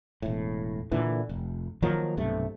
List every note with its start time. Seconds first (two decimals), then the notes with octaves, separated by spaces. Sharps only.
0.22 E1 A2
0.92 A#2 D3 E3
1.29 F1
1.82 D#3 F3 F#3 A#3
2.17 B1 G2 C3 A3